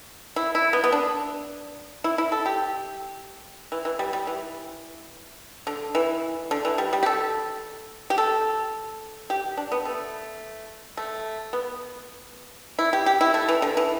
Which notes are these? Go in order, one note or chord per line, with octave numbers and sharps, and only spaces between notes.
E4
E4
B3
B3
D4
E4
E4
A4
G4
E3
E3
G3
G3
E3
D3
E3
D3
E3
G3
G3
G4
A4
G4
A4
G4
D4
B3
A3
A3
B3
E4
G4
G4
E4
A3
E3
D3
E3